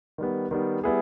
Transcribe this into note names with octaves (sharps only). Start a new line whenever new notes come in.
D#3 G3 B3
D#3 G3 B3
G3 B3 E4 G#4